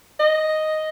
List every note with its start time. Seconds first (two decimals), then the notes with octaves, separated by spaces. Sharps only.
0.20 D#5